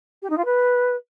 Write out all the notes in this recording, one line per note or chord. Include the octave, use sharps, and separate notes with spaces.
G4
D#4
F4
B4